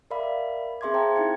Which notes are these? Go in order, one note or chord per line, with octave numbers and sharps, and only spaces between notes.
A#4 D5 E5 F5 B5
C4 G#4 E5 C6 D6 G#6
C5 F5 G5 A5 A#5
D#4 E4 G#6 C#7